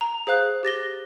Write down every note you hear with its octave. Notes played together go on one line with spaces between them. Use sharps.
A#5
G#4 C5 F5 F#6
G4 A6 A#6 G7